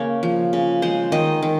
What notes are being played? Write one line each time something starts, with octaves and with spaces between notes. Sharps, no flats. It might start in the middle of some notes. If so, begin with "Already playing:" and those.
Already playing: C#3 A#3 C#5
F3
C#3
G#3 C5
D#3 D#5
D#3